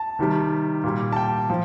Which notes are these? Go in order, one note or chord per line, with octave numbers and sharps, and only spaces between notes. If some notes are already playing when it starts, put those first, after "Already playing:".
Already playing: A5
C3 D#3 G3
A#2 G3
A5
G5
F3